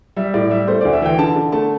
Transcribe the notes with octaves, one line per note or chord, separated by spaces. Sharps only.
G3 E5
A2 D5
G3 E5
A3 C5
D2 D5
E5
E3 G5
D3 A5
D3
A3 A5